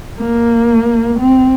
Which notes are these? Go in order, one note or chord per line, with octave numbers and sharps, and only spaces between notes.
A#3
C4